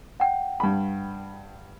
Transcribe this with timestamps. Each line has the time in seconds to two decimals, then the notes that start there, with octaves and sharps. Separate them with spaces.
0.20 F#5 G5
0.60 G2 B5